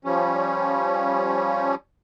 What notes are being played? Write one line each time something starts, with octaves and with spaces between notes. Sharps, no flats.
F3 G3 C#4